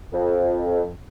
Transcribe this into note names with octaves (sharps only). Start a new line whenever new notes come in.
F2